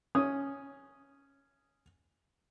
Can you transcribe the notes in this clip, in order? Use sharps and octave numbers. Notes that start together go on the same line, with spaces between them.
C#4 D#6